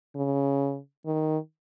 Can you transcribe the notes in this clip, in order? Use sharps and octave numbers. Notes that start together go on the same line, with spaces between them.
C#3
D#3